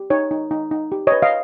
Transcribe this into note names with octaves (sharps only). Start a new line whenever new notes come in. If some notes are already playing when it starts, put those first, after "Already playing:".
Already playing: G4
D#4 C#5
D#4
D#4
D#4
G4
B4 C#5 D#5
D#5 F5